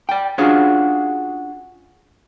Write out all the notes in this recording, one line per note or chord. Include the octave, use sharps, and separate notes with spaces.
D5 G5
C#4 D4 F4 F#4 G#4